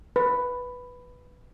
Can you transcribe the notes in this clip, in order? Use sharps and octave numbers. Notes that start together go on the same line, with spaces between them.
B4